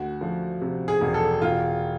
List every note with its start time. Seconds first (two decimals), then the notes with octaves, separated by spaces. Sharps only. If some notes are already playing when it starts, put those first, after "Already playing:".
Already playing: D2 F#4
0.21 F3
0.61 C3
0.88 G#4
1.01 E1
1.14 A4
1.42 E1 F4